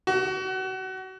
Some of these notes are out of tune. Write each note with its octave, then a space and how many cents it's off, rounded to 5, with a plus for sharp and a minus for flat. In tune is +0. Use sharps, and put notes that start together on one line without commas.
F#4 +30